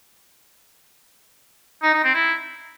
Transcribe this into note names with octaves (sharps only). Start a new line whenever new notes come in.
D#4
D#4
C4
E4